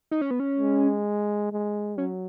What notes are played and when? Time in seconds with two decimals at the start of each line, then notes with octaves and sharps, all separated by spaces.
0.11 D#4
0.21 C#4
0.31 B3
0.40 C#4
0.58 G#3
1.52 G#3
1.98 F#3 C#4